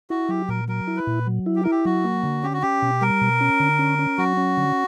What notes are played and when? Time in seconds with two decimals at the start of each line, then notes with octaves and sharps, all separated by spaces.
0.10 E4 F#4
0.29 F#3 G4
0.49 A#2 A#4
0.68 F#3 A#4
0.87 E4
0.97 B4
1.07 A#2
1.27 F#3
1.46 E4
1.56 G4
1.63 E4 A#4
1.71 G4
1.85 F#3 F#4
2.04 A#3
2.23 D3
2.43 C#4 G4
2.53 F#4
2.62 C#4 G4
2.82 B2
3.01 G3 A#4
3.21 B2
3.41 C#4
3.60 D3
3.79 C#4
3.99 C#4
4.18 F#3 F#4
4.37 C#4
4.57 D3